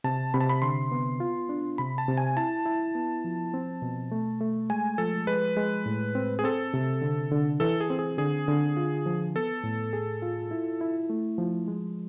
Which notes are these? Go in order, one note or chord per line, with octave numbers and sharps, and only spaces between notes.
C3 A5
C3 B5
A5
B5
D3 C6
B3
F4
D4
C3 B5
A5
C3
G#5
E4 A5
E4
B3
F3
C4
B2
A3
A3
G#3 G#5
F3 A4
G#3 B4
G#3
A2
C4
G#4
C4 A4
C3
D3
D3
E3 A4
G#4
C4
G#4
D3 G#4
D3
F4
F3
B3 A4
A2
G#4
F4
E4
E4
A3
F3
G#3